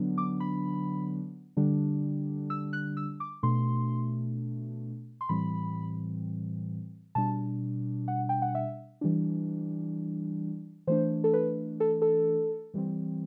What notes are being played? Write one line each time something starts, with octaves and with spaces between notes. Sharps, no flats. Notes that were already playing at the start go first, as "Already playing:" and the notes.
Already playing: D3 F#3 B3 D4
D6
B5
D3 G3 D4
E6
F#6
E6
D6
B2 A3 D4 C6
C6
A2 E3 G3 C4 B5
B2 G3 D4 A5
F#5
G5
F#5
E5
E3 G3 D4
E3 A3 D4 C5
A4
B4
A4
A4
E3 G3 C4